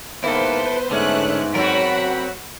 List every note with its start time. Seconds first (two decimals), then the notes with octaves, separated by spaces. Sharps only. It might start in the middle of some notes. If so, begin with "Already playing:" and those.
0.24 G#2 D#3 A#3 B3 E4 A4 B4 C5
0.91 G#2 D3 A3 C#4 F#6
1.55 F#3 C4 F#4 A#4 F#5 B5